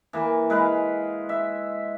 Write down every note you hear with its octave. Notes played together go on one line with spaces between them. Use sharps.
E3 A#3
G#3 B4 F5
E5